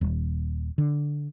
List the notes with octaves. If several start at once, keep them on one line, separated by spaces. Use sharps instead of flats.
D#1
D3